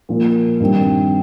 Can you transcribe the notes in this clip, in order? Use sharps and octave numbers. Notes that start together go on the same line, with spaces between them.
A#2 F3 A#3
G2 D#3 G3 C4